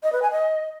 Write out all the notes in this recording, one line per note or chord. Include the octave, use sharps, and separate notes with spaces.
D#5
B4
G#5
D#5